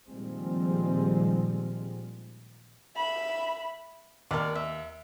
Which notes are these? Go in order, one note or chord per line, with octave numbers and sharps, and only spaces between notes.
A#2 D#3 F3 G3 G#3 C4
E5 B5
D#2 A#4 D5
E5